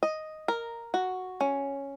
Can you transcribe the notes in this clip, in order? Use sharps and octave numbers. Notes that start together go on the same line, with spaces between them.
D#5
A#4
F#4
C#4